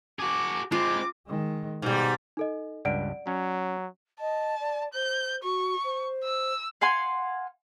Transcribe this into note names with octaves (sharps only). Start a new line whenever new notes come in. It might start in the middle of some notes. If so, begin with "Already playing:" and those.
F#4 G#4 D6
G#3 C4 F4 D6
D#3 G#3
G#2 B2 G3
D#4 A4 D#5
C#2 G2 D5 F#5 D7
F#3 C#4
D#5 A5
D5
C5 G6
F#4 C#6
C5
E6
F5 F#5 G#5 C6